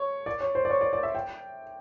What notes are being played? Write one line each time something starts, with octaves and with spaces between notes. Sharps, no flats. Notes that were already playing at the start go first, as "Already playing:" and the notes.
Already playing: C#5
D5
C#5
C5
D5
C#5
D5
D5
E5
G5